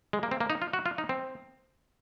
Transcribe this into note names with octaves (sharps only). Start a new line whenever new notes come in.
G#3
A#3
C4
A#3
D#4
F4
F#4
F4
D#4
C4